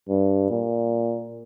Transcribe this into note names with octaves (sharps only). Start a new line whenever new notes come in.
G2
A#2